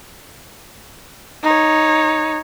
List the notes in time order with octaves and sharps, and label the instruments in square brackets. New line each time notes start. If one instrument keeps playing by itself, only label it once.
[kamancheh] D#4 C#5